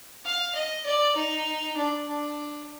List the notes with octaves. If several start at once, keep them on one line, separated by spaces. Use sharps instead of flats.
F5
D#5
D5
D#4
D4
D4